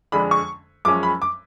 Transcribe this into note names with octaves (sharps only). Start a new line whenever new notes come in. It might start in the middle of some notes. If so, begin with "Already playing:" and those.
F2 D3 G#3 D4 B5
C#6
F#2 F3 G#3 C#4 D6
B5
D6